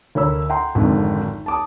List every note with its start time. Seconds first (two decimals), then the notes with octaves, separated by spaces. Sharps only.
0.15 D2 A#4 C#5 B5 E6
0.49 E5 F#5 G5 A#5 C6
0.75 G#1 F2 G#2 D3
1.46 A5 D6 D#6